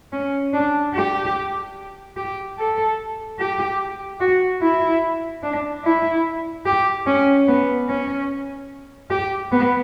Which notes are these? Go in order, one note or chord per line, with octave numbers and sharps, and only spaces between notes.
C#4
D4
G4
G4
A4
G4
F#4
E4
D4
E4
G4
C#4
B3
C#4
G4
B3